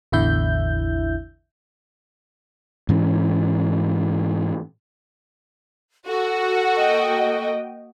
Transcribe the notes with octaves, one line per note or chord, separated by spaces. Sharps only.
A1 E2 D3 E4 E5 G6
G#2 E3 C#4
F#4 A4 F#5
A#3 D#5 G5